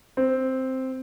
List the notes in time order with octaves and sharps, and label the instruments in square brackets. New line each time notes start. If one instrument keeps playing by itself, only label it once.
[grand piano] C4